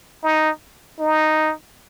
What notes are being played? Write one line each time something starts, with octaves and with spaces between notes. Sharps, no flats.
D#4
D#4